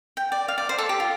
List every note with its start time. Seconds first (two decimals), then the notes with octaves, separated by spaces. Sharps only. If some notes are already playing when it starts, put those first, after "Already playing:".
0.17 G5
0.32 D5
0.48 F5
0.58 D5
0.69 C5
0.78 A4
0.89 G4
1.00 F4